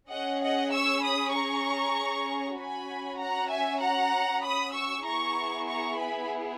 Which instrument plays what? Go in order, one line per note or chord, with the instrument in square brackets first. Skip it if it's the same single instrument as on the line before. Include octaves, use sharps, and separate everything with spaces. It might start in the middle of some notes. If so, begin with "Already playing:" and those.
[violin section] C#4 G#4 D#5 F#5
D#5 F#5
C#6 E6
B5 D#6
A#5 C#6
C#4 F#4 G#5 B5
F#5 A#5
E5 G#5
F#5 A#5
B5 D#6
C#6 E6
B3 E4 G#4 A#5 C#6
A#5 C#6
G#5 B5